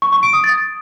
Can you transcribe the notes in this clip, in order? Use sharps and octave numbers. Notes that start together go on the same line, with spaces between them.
C#6
C#6
D7
D#6
A6